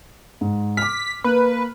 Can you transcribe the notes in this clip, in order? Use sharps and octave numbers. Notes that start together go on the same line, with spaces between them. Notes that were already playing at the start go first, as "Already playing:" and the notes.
G#2
D6 F6 B6
A#3 B4